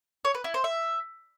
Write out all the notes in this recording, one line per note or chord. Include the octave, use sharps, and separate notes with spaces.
C#5
B4
E4
C5
E5